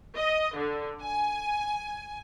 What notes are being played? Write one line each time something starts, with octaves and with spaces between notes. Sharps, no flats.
D#5
D3
G#5